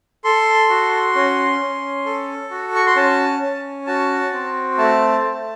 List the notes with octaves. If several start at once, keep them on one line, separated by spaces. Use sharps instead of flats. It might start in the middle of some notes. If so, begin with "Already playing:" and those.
A4 C6
F#4
C#4
C#4
A4
F#4
C#6
C6
C#4 A5
C#4
F#4 A5
C4
A3 A5
A3